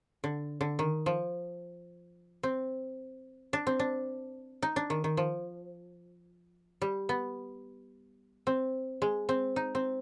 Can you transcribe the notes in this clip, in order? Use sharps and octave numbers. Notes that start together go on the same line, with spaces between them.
D3
D3
D#3
F3
C4
D4
C4
D4
D#4
D4
D#3
D#3
F3
G3
B3
C4
G#3
C4
D#4
C4